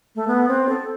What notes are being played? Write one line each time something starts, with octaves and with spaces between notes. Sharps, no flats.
A3
B3
C4
A4